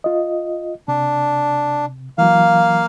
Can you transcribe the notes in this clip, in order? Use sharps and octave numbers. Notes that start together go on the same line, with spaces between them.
F4 D#5
C3 D4
E3 F#3 A#3 F5